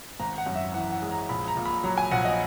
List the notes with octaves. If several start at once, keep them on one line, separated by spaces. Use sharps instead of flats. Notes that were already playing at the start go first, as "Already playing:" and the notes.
G#1 A#5
F#5
F#2
E5
E3 F#5
F#5
G#3
A#5
A#1 B5
A#5
A#2
B5
F#3 A#5
G#5
A#1 F#5
D#5